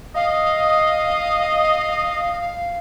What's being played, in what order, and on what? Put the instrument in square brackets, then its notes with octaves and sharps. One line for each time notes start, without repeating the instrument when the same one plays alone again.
[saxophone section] D#5 [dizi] F5